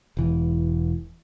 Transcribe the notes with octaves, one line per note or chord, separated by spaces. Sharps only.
E1 E3